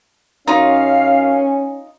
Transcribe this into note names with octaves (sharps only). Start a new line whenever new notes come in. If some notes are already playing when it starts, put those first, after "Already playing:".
F#2 C#4 D#4 F4 F5